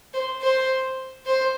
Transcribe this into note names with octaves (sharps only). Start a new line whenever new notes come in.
C5
C5
C5